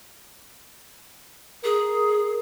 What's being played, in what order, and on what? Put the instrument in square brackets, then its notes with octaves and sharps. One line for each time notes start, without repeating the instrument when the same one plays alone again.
[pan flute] G#4 [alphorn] A#4